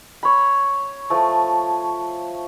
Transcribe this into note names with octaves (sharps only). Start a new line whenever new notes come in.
C#5 B5
F3 A3